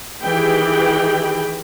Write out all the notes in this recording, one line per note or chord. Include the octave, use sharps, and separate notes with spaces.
D#3 E3 G4 G#4 G5 B5